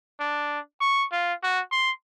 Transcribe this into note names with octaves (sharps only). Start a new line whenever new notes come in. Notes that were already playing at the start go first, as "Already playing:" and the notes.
D4
C#6
F4
F#4
C6